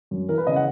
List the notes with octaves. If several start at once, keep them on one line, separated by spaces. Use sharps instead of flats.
F#2
E3 A#4
B4
C#3 D#5
F#5